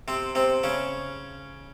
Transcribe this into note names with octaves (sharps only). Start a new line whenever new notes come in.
C3 C4
C3 C4
C#3 C#4